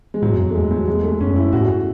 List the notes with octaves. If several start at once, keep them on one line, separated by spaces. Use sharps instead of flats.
G#3
A2 F#3
F#2
E2
A3
G#3
F#3
G#3
A3
F#2 C#4
E4
A2 F#4
G#2